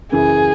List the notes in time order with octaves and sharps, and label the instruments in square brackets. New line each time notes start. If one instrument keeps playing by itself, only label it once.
[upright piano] F#2 C#3 E3 [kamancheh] G#4